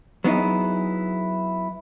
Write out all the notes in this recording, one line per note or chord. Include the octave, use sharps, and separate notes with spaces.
F#3 B3 D#4 E4 G#4